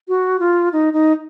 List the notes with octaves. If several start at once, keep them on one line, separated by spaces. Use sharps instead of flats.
F#4
F4
D#4
D#4